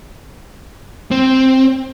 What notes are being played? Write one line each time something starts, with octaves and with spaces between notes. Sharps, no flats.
C4